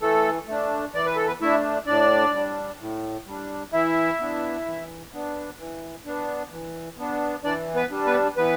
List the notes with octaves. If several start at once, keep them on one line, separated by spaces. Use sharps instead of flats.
E3 A3 A4
A3 D4
E3 D5
B4
A4
B3 B4
A3 D4 E4 E5
A2 D4 D5
G3 D4
A2
G3 D4
E3 E4 E5
B3 D4
E3
B3 D4
E3
B3 D4
E3
B3 D4
E3 D4 D5
B3 B4
G3 D4
B3 B4
E3 B3 B4